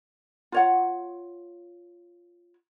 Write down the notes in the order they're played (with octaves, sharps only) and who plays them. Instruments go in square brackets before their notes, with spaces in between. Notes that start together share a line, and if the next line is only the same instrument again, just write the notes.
[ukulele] F4 C#5 F#5